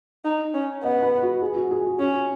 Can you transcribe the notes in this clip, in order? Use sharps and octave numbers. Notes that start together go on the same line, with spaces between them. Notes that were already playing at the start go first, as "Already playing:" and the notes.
D#4
C#4
B3 D#5
B4
F#4
G#4
F#4
G#4
F#4
C#4 F#4